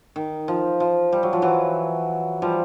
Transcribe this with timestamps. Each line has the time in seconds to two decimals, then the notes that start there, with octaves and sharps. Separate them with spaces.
0.16 D#3
0.48 F3
0.80 F3
1.12 G3
1.23 F#3
1.33 F3
1.42 E3 F#3
2.42 F3 G3